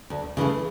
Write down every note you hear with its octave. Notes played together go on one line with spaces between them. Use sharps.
D2
C#3 E3 A3